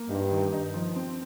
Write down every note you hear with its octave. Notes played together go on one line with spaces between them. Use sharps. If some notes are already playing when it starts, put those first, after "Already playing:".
Already playing: A#3
G2 D#4
D#3
D#4
F3
C4